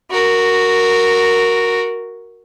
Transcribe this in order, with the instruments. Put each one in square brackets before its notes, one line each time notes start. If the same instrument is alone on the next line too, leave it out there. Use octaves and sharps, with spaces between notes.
[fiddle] F#4 A#4